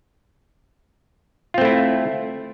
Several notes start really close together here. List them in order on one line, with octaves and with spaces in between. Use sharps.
F4 C4 A3 E4